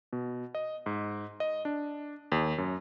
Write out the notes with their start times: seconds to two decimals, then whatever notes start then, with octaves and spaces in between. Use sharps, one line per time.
0.13 B2
0.55 D#5
0.86 G#2
1.40 D#5
1.65 D4
2.32 D#2
2.58 F#2